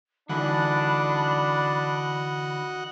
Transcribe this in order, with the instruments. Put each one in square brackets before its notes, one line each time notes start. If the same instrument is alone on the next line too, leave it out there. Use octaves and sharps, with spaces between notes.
[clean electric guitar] D3 E3 [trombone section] D4 [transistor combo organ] F#4 D#5 F#5 [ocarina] B5